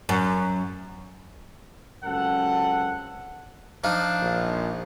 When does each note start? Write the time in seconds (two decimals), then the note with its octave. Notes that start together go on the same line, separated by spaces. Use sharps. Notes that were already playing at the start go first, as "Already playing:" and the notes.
0.09 F#2
2.05 C#2 F#2 C4 A4 F#5
3.84 F3 D4 D#4 F4
4.22 A#1